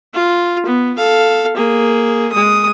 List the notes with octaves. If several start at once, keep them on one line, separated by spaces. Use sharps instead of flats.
F4
B3
A4 F5
A#3 G#4
G#3 D#6